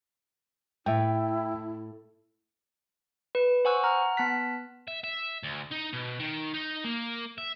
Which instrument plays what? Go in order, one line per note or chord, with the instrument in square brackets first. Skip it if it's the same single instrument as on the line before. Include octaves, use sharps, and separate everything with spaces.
[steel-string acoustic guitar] A2 [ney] E4 [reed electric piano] E5 G5
[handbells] B4
C5 F#5 G#5 C#6 E6 F#6
F#5 A#5 F6
B3 A5 F#6 B6
[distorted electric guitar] E5
E5
D2
D#4
B2
D#3
D#4
A#3
E5